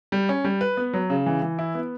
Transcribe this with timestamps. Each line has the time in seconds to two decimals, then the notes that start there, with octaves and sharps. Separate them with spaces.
0.12 G3
0.29 C#4
0.44 G3
0.61 B4
0.77 B3
0.93 F#3
1.10 C#3
1.26 E3
1.42 E3
1.59 E4
1.75 B3